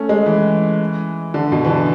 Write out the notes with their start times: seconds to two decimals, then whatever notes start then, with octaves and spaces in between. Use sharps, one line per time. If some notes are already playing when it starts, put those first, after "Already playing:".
Already playing: A3 C#4
0.09 G#3
0.26 E3
1.34 D3
1.52 B2
1.65 E3
1.70 D3